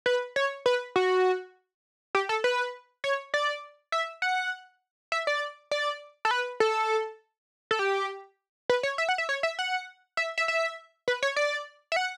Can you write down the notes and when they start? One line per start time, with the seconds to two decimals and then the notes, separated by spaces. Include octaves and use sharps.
0.06 B4
0.36 C#5
0.66 B4
0.96 F#4
2.15 G4
2.29 A4
2.44 B4
3.04 C#5
3.34 D5
3.92 E5
4.22 F#5
5.12 E5
5.27 D5
5.71 D5
6.25 A4
6.31 B4
6.60 A4
7.71 A4
7.79 G4
8.69 B4
8.83 C#5
8.98 E5
9.09 F#5
9.18 E5
9.29 C#5
9.43 E5
9.59 F#5
10.17 E5
10.38 E5
10.48 E5
11.08 B4
11.23 C#5
11.36 D5
11.92 E5
11.96 F#5